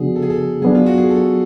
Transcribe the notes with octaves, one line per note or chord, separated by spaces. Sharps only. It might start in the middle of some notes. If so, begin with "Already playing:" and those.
Already playing: C#3 F3 B3 D4 F#4 G#4
A4
G#4
A4
F#3 B3 D4 G#4
F4
F#4
G#4
A4